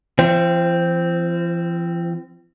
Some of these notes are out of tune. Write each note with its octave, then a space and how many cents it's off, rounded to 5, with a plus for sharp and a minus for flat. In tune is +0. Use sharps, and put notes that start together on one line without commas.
F3 -45 C4 +0